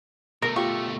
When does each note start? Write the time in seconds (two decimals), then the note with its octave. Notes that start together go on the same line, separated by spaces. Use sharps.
0.42 B2 A3 A#4
0.56 F4 G4 C#6